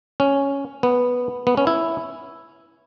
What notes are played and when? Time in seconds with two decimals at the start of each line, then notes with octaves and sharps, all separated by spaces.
0.20 C#4
0.83 B3
1.47 B3
1.57 C#4
1.67 E4